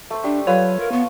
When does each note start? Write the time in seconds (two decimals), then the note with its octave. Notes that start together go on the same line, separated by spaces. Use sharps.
0.10 A3 C5
0.24 G3 D4
0.47 F#3 F4 A4 B4 C#5
0.80 A#4
0.92 B3 C#6